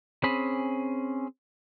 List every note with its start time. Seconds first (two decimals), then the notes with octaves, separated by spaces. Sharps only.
0.24 C4 C#4 G#4 B5